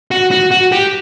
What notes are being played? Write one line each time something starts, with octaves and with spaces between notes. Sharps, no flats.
F#4
F#4
F#4
G4